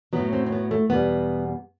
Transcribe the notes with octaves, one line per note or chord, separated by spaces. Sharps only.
A2 F#3 B3
C4
C4
B3
A3
E2 B2 G3 B3